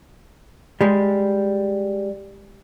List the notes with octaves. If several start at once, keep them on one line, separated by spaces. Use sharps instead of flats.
G3 G#3